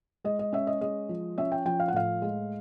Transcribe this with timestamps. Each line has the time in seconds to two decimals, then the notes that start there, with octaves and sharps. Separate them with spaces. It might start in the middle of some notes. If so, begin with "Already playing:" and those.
0.24 G#3 D#5
0.39 D#5
0.53 C#4 E5
0.67 D#5
0.81 G#3 D#5
1.09 F3
1.38 C#4 E5
1.52 G5
1.65 F3 G5
1.80 F5
1.88 F#5
1.93 A2 F5
2.22 G#3